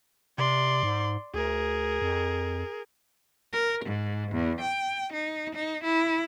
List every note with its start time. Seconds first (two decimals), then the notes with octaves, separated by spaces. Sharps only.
0.38 C3 D5 C6
0.83 G#2
1.34 D2 G#4 A#4
2.02 F2
3.53 A#4
3.85 G#2
4.32 E2
4.61 G5
5.13 D#4
5.55 D#4
5.84 E4